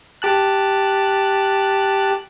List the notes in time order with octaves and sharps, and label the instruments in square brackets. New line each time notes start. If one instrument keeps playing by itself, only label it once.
[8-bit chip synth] G4 A5 F#6